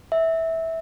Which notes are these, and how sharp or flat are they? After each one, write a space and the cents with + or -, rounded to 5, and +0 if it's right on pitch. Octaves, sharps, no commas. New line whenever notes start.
E5 -15